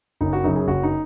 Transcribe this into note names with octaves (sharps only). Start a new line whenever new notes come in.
F#1 D#4
F#4
F#2 C#3 F#3 D#4
G#4
F#1 F#4
D#4